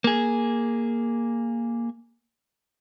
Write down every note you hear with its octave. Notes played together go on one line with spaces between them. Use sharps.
A#3 G#4